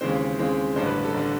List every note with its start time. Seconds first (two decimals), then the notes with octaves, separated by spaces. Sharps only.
0.01 D#2 C#3 E3 G#3 C4 C5
0.38 D#2 C#3 E3 G#3 C4
0.76 A1 G2 D3 C5
0.86 B4
1.05 A4
1.14 A1 D3